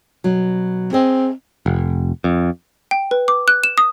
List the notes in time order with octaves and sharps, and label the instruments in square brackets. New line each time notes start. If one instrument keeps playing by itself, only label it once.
[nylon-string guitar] B2 F#3
[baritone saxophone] C4 [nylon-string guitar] G#4 D#5
[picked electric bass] F1
F2
[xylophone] G5
B4
D6
F#6
E7
D#6